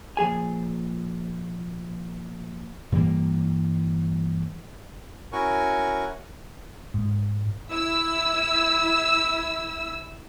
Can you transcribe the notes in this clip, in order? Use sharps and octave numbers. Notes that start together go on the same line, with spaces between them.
A#2 F3 G#4 G#5
G2 E3 G3 A#3
C#4 E4 F#4 A#4 G#5 C#6
G#2
E4 E6